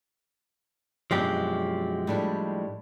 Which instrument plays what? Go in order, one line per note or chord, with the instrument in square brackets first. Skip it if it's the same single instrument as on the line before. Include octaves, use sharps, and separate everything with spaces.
[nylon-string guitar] F#2 B2 D4 [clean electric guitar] F3 G#3 G4
[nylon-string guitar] A2 G3 D4